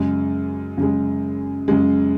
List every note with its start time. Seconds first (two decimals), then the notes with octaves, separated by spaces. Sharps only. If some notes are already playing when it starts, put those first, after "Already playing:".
Already playing: F#2 C#3 G#3
0.78 F#2 C#3 G#3
1.68 F#2 C#3 G#3